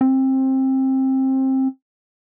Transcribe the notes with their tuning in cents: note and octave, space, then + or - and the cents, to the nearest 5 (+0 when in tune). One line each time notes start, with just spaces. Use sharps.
C4 +20